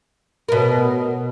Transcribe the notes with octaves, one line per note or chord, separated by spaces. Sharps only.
B2 A#4